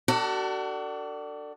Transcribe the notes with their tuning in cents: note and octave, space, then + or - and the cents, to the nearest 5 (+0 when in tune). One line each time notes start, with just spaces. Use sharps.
D4 +10 F#4 +40 A4 +40